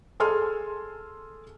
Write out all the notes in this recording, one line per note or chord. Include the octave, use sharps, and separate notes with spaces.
G#4 A4 G#5 C6 F6